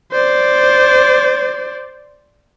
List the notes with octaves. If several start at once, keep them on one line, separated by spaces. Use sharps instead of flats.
C5 D5